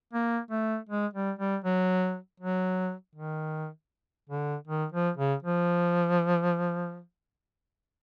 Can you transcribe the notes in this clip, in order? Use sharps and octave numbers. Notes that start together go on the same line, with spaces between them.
A#3
A3
G#3
G3
G3
F#3
F#3
D#3
D3
D#3
F3
C#3
F3